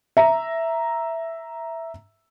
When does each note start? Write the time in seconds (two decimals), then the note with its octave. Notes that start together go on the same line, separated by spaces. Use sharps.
0.17 E5 A#5